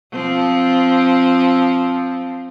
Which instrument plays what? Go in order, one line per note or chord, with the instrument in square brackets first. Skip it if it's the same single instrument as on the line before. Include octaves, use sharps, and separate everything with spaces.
[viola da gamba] F3 C4